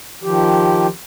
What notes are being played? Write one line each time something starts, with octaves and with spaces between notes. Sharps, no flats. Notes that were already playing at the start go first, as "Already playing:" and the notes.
D#3 F3 G4